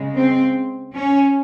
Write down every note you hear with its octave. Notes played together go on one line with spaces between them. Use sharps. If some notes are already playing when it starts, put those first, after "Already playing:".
Already playing: C#3 G#3
C4
C#4